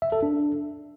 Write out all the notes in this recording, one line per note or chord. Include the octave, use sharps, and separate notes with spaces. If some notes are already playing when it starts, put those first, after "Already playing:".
E5
A4
D4